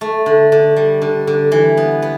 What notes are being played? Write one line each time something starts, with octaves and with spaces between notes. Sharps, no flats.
A3
D3
D3
G3
D3
D3
E3
B3
B3